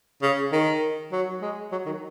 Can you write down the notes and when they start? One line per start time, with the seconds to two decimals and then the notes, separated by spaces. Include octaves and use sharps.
0.22 C#3
0.52 D#3
1.12 F#3
1.42 G#3
1.72 F#3
1.86 D#3